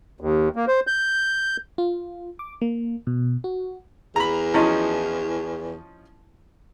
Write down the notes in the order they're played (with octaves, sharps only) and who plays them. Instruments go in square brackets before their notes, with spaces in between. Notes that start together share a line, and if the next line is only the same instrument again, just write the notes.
[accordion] D#2
A#3
C5
G6
[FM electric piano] F4
D6
A#3
B2
F#4
[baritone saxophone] E2 [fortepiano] A#5 B5
[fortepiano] F3 C#4 D#4 [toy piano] E4 F#4